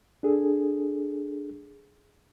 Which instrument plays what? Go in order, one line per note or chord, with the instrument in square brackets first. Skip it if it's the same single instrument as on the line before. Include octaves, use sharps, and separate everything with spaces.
[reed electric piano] D4 G#4 A4